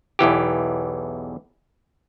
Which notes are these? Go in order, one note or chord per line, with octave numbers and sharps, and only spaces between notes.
B1 E2 E3 G4